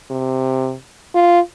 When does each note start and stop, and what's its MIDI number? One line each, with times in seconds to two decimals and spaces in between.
0.11 0.74 48
1.15 1.40 65